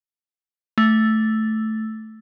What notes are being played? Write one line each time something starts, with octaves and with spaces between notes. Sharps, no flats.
A3